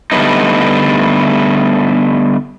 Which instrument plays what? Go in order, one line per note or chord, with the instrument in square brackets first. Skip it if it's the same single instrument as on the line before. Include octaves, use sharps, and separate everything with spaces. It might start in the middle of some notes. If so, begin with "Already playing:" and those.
[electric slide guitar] D3 G3 A3 B3 D#4